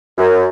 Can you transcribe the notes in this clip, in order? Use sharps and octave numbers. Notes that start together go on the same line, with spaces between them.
F#2